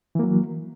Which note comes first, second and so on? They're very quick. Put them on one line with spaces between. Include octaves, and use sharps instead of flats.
E3 A#3 F#3